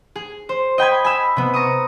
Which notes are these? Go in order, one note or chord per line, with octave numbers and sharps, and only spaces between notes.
G#4
C5
D#5 G5 B5 G#6
G#5 B5 E6
C3 B3
A#5 C#6 D#6